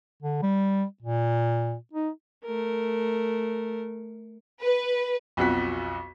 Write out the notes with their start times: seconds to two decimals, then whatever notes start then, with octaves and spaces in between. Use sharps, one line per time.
0.22 D3
0.42 G3
1.03 A#2
1.94 D#4
2.45 A3 A#4
4.62 B4
5.37 B1 F2 F#4 B6